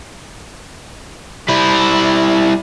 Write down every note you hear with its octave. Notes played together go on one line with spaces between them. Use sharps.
G3 E4